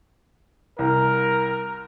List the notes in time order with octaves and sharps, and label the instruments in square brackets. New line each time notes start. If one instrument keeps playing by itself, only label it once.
[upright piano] C2 [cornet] A#4